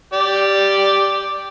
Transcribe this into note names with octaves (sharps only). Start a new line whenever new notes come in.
G4 D5